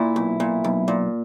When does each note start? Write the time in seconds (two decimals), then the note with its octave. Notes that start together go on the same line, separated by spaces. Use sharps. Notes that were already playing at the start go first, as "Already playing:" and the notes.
Already playing: A#2 E4
0.16 B1
0.40 A#2
0.64 B1
0.88 A#2